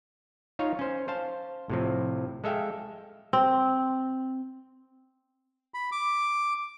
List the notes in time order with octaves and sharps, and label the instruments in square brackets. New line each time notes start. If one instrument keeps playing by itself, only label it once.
[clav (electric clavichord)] D#4 F4 C#5 F5
C#4 C5
C5 F5 A5
A2 C3 F3
G#3 A4 E5 F5 G5
[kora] C4
[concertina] B5
D6